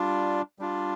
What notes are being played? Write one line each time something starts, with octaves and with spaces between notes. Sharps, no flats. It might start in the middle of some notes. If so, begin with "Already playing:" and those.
Already playing: G3 D4 F4
G3 D4 F4